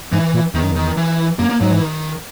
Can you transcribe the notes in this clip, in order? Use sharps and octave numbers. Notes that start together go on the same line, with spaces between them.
G#2 E3
A#2
E2 D#3
F#2
E2 D#3
E3
F#2 A#3
A#3
G#2 F#3
E3
D#3